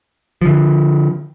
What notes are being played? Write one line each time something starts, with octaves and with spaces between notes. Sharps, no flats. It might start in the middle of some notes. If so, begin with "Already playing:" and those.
D3 F3